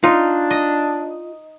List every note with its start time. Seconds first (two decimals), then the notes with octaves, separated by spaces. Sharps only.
0.03 D4 D#4 F4
0.51 D#5